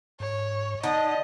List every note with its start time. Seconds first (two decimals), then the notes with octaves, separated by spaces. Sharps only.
0.20 G#2 C#5
0.83 D3 D#4 D#5 D#6